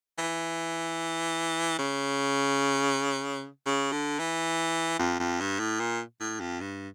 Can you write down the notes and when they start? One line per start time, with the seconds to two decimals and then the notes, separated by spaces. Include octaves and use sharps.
0.18 E3
1.79 C#3
3.66 C#3
3.92 D3
4.19 E3
4.99 F2
5.20 F2
5.40 G2
5.59 A2
5.80 A#2
6.20 A2
6.40 F2
6.61 G2